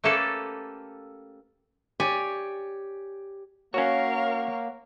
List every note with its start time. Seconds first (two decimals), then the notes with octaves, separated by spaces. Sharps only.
0.04 A3 A#3 C#4 G4 A4 B4
2.00 G4 C#5 D5 G#5
3.74 A#3 C#4 F#4 A#4 C#5 F5 F#5 C#6